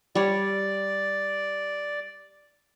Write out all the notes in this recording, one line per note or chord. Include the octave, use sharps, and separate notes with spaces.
G3 C#5 D5